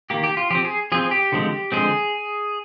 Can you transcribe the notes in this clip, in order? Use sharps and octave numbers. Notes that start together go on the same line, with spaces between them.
D#3 A#3 G4
G4
F4
F3 C4 G4
G#4
F3 C4 G#4
G4
D3 F3 G#3 C4
D3 F3 G#3 C4 G#4